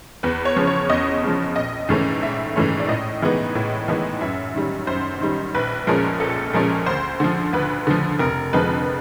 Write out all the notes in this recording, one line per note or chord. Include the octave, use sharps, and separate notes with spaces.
E2 B4
C#5
C#3 F3
C#5
E2 D#5
C#3 F3
A#1 D#5
G#2 E3 A3 C#4
A#1 E5
G#2 E3 A3 C#4
D5
A2 D#5
E3 G#3 B3 D#4
A2
E3 G#3 B3 D#4
F#2 E5
D#3 G3
F#2 C5
D#3 G3
A#1 B4
A#2 F3 G#3 C#4 A#4
A#1 A4
A#2 F3 G#3 C#4 A#4
D2 C5
D3 F3
D2 B4
D3 F3
F1 A#4
F2 D3 F3 G#3 B4